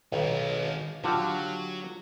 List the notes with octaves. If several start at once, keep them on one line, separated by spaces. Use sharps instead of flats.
B1 D#3 G#3
D3 F#3 F4 G4